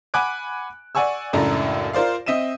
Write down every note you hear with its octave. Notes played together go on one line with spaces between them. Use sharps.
F#5 G#5 B5 D6 F#6 D7
D5 F#5 G#5 C#6 E6
C#2 F#2 A2 D4 A4 A#5
F4 A#4 C5 D5 F5
C4 D#5 E5 D#7 E7